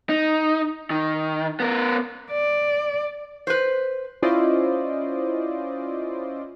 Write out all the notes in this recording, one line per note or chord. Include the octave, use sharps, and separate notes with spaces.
D#4
D#3
B3 A#4
D5
B4 C5
C#4 E4 F4 C5 D5 D#5